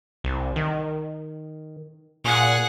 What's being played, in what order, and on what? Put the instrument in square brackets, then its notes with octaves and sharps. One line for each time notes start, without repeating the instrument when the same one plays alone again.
[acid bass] C2
D#3
[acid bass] A#2 [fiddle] G#4 F#5